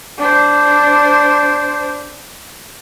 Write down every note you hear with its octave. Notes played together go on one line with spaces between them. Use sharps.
D4 C5